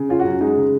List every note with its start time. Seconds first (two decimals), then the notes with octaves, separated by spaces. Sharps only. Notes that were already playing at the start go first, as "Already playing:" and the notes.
Already playing: C#3
0.09 C#4 F4
0.19 F#4
0.25 F#2
0.41 G#3 D#4
0.57 C#3